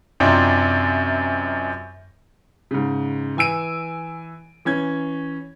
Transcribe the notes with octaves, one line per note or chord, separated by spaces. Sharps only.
F#2 C3 C4 D4 D#4 F4
G#2 C#3
E3 G#5 E6 D7 D#7
E3 C#4 G#6